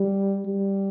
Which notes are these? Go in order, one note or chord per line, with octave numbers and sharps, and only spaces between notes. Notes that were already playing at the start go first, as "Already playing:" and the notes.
Already playing: G3
G3